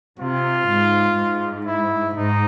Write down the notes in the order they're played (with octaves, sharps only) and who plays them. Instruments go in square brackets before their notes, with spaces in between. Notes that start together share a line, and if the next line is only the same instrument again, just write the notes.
[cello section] C3 [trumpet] F4
[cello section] G#2
G#2
[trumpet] E4
[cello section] G#2 [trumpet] D#4